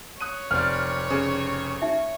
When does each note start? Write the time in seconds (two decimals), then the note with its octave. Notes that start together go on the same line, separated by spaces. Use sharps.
0.21 C#5 D#6 F#6 D#7
0.51 F1 C4 D5 F6
1.10 C#3 C5
1.82 D#4 E5